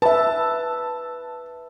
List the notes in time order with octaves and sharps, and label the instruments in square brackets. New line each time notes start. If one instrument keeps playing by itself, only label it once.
[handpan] B4 E5 [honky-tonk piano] A5